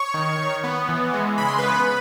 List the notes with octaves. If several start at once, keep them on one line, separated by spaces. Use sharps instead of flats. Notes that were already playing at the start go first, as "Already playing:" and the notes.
Already playing: C#5 C#6
D#3
D#3
B3
E3
G#3
C#3 B5
C6
B3 B4 B5